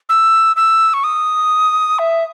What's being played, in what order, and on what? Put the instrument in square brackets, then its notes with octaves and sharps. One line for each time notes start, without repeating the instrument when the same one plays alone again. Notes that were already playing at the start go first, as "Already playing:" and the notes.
[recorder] E6
E6
C#6
D#6
E5